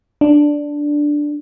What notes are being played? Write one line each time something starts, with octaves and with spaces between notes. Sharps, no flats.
D4